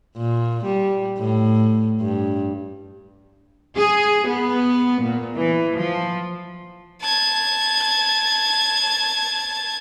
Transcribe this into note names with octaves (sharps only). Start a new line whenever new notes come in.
A#2
G3
A2
G2
G#4
B3
A#2
E3
F3
A5 G#6